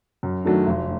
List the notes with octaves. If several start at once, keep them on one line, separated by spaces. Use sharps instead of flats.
F#2
D#3 F#3 A3 D4
F1